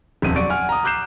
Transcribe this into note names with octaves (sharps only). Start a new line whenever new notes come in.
D#1 F2 C3 D#7
F#3 D5 C#6 D7
F#5 G#5 F6
A#5 D#6
D6 F#6 G6 C7 E7